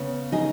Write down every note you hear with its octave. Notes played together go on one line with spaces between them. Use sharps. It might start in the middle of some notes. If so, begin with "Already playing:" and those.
Already playing: C#3 B3
D#4 G#4